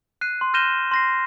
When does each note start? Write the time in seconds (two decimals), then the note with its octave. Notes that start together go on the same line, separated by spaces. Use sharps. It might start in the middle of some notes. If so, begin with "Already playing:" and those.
0.21 F#6 C7 D#7
0.41 C6
0.54 F6 G6 A#6 D#7 E7 G7
0.91 C6 A#6 C7